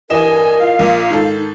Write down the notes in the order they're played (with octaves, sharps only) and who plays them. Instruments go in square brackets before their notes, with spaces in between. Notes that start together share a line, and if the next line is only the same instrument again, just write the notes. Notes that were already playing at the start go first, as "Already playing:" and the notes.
[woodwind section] D2 G2 G#5 [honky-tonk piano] E3 D#5 E7 [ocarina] A#4
[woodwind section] F4 F5
[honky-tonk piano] A#1 A#2
[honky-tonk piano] G#2 D#3 A4 [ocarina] D#4